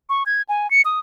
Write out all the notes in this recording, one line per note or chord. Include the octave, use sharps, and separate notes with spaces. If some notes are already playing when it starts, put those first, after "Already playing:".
C#6
G#6
G#5
C#7
D#6